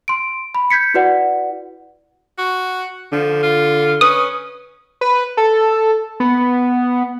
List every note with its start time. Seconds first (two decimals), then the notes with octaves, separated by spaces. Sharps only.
0.08 C6 D7
0.55 B5
0.70 G6 G#6 B6 C#7
0.94 E4 F#4 B4 D5 F#5
2.38 F#4
3.12 D3 F3
3.43 F4
4.01 C#4 B4 D#6
5.01 B4
5.37 A4
6.20 B3